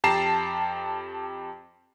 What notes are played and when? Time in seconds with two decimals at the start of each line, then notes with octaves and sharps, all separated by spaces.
0.04 F2 G4 A5 A#5 C7 E7